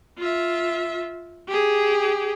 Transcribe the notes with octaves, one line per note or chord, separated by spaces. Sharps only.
F4 E5
G4 G#4